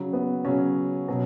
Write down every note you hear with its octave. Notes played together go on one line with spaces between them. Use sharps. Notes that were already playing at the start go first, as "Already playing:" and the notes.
Already playing: C#3 F#3
B3
C#3 F#3 C#4
B2 F#3